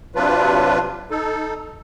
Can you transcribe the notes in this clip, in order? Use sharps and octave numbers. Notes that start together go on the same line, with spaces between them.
C3 F#3 D4 F4 B4
D#4 A4